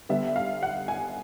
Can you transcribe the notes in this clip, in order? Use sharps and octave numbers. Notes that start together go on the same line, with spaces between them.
D3 G3 B3 E5
F5
F#5
G#5